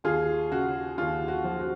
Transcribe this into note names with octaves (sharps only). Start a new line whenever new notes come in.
D#2 F4 G#4
C#3 F#4
D#2 F4
F#4
F3
F#4